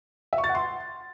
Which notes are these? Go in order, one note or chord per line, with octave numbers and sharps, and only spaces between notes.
E5
C#6
A6
F#5
C6